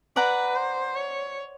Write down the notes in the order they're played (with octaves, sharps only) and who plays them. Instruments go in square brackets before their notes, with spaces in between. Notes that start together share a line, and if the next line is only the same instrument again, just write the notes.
[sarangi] B4 [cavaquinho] D5 F#5 A#5
[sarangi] C5
C#5